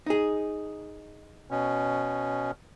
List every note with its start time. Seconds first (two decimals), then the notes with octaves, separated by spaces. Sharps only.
0.06 D#4 G#4
1.51 B2 C#4